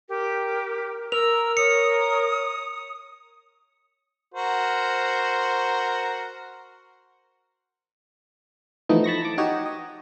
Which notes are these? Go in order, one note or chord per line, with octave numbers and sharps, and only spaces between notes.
G4 A#4
A#4 E6 F7
C#5 D#6 C#7
F#4 A#4 C5
E3 F3 A3 B3 D#4
A5 B5 C#6 A#6
A5 D6
D#4 F#4 G4 C#5 D#5
D#5